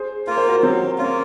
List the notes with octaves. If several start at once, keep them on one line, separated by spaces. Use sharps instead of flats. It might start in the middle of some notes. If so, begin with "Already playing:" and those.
Already playing: G#4 C5
A#3 F4 A#4
C5
F#4 A#4
F#3 C4
A#3 C#4 F4